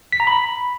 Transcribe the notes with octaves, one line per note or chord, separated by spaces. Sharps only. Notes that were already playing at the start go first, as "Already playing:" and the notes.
B6
A#5
B5